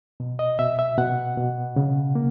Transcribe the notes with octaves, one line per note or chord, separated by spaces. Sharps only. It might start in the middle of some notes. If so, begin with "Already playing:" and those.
B2
D#5
B2 E5
E5
B2 F#5
B2
C#3
A#3